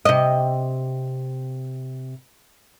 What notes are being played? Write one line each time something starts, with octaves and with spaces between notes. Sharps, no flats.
C3 D#5